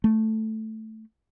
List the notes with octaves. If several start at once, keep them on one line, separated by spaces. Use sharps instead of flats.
A3